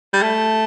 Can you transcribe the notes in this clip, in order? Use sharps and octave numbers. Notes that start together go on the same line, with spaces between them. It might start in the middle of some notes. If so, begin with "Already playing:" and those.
G3
A3